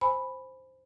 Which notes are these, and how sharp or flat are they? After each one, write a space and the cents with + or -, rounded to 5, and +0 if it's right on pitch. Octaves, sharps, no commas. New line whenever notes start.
C5 +0 G#5 +0 B5 +0